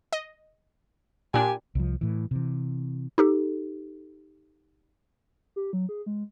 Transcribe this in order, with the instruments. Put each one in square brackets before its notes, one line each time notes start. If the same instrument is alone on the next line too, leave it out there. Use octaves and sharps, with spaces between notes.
[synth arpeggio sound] D#5
[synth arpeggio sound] A#2 D4 [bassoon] G4 [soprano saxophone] G#5
[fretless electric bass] C2 F3
A2 E3
C3 E3
[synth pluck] D#4 G4 A4
[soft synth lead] G4
F#3
G#4
G#3